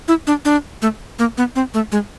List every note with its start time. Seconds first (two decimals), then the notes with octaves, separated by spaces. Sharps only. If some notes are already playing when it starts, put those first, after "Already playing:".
0.08 E4
0.27 D4
0.45 D4
0.82 A3
1.19 A#3
1.37 B3
1.56 C4
1.74 A3
1.92 G#3